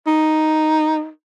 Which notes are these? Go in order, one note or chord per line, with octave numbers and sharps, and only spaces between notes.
D#4